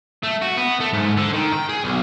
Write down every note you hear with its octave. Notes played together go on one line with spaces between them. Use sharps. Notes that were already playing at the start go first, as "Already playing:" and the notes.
A3
F#4
B3
A3
G#2
D3
D#3
G5
G#4
B1